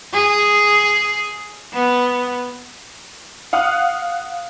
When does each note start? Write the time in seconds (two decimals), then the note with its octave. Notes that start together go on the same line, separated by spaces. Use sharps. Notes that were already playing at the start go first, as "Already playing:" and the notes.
0.14 G#4
1.73 B3
3.53 F5 F#5 D#6 F6 F#6